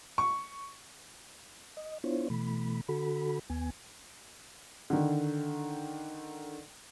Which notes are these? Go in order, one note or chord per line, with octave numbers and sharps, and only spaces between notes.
C#6
D#5
B3 D4 E4 F4 C5 C#5
B2 E3 A3 B5
D3 F#4 A4 B5
D#2 B3 G#5
D3 D#3